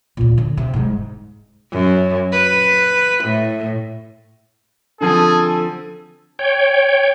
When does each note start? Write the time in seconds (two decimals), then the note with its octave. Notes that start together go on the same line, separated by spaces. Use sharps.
0.17 D2 A#2
0.38 D3
0.57 C3
0.74 G#2 G3
1.72 F#2
2.32 B4
3.24 A2
5.01 D3 F3 C4 G#4 A4
6.39 C#5 G5